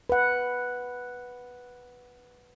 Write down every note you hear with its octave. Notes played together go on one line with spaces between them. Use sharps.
B4 F#5